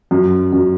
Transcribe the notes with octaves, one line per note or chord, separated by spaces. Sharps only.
F#2
F#2